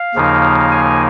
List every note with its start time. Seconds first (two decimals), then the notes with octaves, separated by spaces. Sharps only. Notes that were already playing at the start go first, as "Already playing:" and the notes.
Already playing: F5
0.15 D#2 C#3 F3 A#3 D#4
0.72 G#5